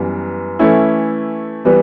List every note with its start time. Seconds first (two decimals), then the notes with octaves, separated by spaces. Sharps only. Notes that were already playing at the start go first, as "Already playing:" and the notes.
Already playing: F#2 E3 G3 B3
0.59 E3 A3 C#4 E4
1.65 E3 G3 B3